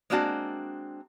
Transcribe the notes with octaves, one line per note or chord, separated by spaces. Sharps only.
G#3 A#3 C4 D4 F#4 A5